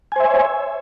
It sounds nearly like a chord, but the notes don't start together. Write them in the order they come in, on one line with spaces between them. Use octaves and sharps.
G#5 C5 E5 C#5